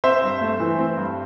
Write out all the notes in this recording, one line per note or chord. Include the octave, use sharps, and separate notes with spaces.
C4 C5 E5
G2
A3
E3
C4
G2